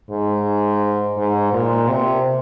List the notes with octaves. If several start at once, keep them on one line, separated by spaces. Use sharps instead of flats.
G#2
G#2
A#2
C3